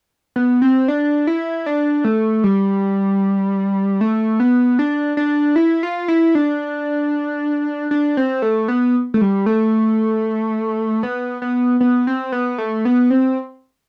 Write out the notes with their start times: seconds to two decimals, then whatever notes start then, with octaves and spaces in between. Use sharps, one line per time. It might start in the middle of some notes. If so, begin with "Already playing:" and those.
0.36 B3
0.62 C4
0.88 D4
1.27 E4
1.66 D4
2.04 A3
2.44 G3
4.01 A3
4.40 B3
4.79 D4
5.17 D4
5.56 E4
5.83 F4
6.08 E4
6.35 D4
7.91 D4
8.17 C4
8.42 A3
8.68 B3
9.14 A3
9.21 G3
9.46 A3
11.03 B3
11.42 B3
11.81 B3
12.07 C4
12.32 B3
12.58 A3
12.85 B3
13.10 C4